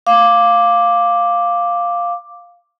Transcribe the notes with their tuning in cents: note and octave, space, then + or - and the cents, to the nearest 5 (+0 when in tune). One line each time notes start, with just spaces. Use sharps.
F5 +0 D6 +0